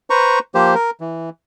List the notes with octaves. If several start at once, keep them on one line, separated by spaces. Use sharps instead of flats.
B4 C5 A#5 C#6
F3 A#3 G4 C5
A#4
E3